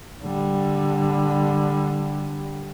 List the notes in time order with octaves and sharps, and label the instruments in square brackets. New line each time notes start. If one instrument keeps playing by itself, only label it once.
[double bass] D3 G3